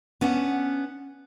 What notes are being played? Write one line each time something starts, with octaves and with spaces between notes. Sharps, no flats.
B3 C#4 D4 F#5